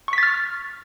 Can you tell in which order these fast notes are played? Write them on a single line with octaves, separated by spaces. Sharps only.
C#6 B6 A6 F6